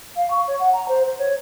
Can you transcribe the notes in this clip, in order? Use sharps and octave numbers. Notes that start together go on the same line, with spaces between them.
F5
C#6
C#5
F#5
A#5
C5
C5
C#5